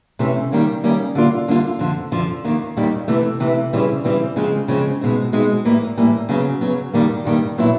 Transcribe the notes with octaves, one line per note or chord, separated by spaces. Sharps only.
C3 E3 A3 C#4
D#3 G3 A#3 C#4
D#3 G3 A#3 C#4
D3 G3 A#3 D4 F4
D3 G3 A#3 D4 F4
F2 D3 F3
F2 D3 F3
D#2 D#3 G3 A#3
D#2 D#3 G3 A#3
C3 E3 A3
C3 E3 A3
C#3 E3 G3 C4
C#3 E3 G3 C4
C#3 F3 G#3 C4
C#3 F3 G#3 C4
B2 G#3 C4 D#4
B2 G#3 C4 D#4
A2 E3 G3 A#3
A2 E3 G3 A#3
C#3 F#3 B3
C#3 F#3 B3
G2 D#3 G3 A#3
G2 D#3 G3 A#3
A#2 F#3 B3 E4